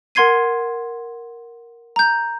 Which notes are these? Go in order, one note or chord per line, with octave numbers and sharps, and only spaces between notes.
A#4 F#5 C6 G#6 C7 D#7
A#5 G6